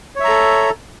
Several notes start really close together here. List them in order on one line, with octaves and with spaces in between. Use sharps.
C#5 E5 A#5 A4